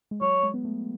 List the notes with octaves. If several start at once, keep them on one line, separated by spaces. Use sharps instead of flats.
G#3
F#3 C#5
G#3
B3
A3